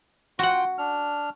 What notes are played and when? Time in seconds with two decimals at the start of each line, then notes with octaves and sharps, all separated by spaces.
0.39 F4 F#4 F#5 G5
0.78 D4 F6